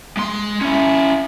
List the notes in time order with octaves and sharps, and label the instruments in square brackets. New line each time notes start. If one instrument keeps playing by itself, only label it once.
[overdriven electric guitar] G#3 C6
C#4 E4